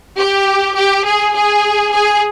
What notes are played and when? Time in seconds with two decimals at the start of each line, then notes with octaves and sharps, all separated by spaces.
0.18 G4
0.75 G4
1.05 G#4
1.34 G#4
1.92 G#4